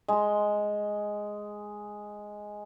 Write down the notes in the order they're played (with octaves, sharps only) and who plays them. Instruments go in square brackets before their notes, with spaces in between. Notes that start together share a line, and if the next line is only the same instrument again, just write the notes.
[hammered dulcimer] G#3 C6